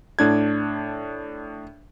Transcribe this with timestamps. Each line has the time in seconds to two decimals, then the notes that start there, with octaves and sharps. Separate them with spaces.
0.19 A2 D4 G#6